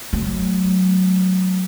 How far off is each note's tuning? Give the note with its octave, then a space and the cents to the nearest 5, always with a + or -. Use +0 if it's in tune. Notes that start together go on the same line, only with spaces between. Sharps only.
F#3 +0 A3 -20